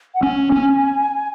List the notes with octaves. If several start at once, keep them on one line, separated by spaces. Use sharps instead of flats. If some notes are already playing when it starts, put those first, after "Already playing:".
F#5
C#4 G#5
C#4